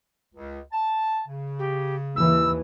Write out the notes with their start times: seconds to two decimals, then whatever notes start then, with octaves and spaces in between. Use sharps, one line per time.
0.35 C#2
0.72 A5
1.28 C#3
1.59 G4
2.16 D#2 E3 E6